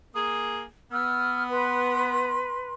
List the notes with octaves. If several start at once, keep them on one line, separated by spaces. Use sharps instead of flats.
A#3 G#4
B3 E6 F6
B4 B5 C6